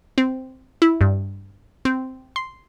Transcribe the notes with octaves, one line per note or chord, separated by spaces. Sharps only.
C4
E4
G2
C4
C6